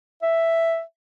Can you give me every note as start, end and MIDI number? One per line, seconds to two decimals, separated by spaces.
0.23 0.81 76